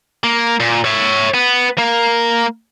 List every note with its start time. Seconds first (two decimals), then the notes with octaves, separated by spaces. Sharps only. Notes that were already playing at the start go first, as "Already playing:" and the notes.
0.23 A#3
0.60 A#2
0.85 C#5 E5
1.34 B3
1.78 A#3